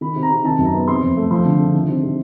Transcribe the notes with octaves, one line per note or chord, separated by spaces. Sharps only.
D#3 B5
C3
A#5
C3
D#3 A5
F#2
A#5
B3
C3 C6
F2
A3
F3 C6
D3
D3
D#3
C3
C3